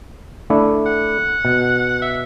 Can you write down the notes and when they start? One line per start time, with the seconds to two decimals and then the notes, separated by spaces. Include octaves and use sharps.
0.50 A3 D4 E4
0.86 F#5
1.45 B2
2.02 E5